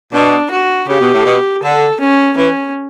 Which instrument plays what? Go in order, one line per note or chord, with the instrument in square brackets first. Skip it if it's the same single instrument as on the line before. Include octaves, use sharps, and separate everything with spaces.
[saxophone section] B2 [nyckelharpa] D4
[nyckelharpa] F#4
[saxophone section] C#3 [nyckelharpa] G4
[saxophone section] B2
A2
B2
[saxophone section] D3 [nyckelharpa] A4
[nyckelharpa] C#4
[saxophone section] E3 [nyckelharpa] C#4